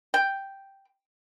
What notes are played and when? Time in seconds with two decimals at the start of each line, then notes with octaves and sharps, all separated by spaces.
0.14 G5